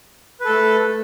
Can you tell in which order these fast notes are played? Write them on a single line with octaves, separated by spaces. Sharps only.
B4 A4 A3